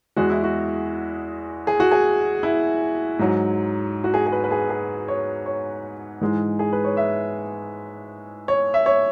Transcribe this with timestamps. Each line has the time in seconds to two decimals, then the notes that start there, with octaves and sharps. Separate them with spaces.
0.16 E2 E3 G#3 F#4
0.30 E4
0.44 F#4
1.67 G#4
1.80 F#4
1.91 G#4
2.43 E4
3.19 G#2 F#3
4.04 F#4
4.14 G#4
4.27 G#4
4.32 B4
4.44 B4
4.51 G#4
4.70 G#4
5.08 C#5
5.46 C#5
6.21 G#2 E3 G#3
6.59 G#4
6.72 B4
6.84 C#5
6.97 E5
8.48 C#5
8.74 E5
8.86 C#5